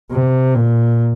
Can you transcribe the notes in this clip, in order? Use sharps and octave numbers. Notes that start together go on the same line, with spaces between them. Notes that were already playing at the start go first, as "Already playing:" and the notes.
C3
A#2